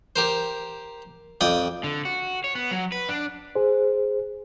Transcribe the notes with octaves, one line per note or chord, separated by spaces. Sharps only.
G4 A#4 C5
F2 D5 G5 D#6
D3
F#4
C#5
B3
F#3
B4
D4
G#4 C5